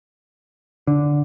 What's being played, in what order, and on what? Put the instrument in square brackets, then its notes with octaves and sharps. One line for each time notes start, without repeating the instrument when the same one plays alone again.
[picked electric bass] D3